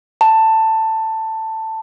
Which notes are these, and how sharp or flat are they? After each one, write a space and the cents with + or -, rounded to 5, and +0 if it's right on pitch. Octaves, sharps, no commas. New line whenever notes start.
A5 +10